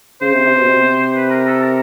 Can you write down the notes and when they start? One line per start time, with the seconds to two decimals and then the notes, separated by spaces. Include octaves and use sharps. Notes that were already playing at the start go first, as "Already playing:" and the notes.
0.21 C#3 C5
0.33 C3
0.45 C3
0.56 B2
0.67 C3
1.15 B4
1.30 A#4
1.46 A4
1.62 A#4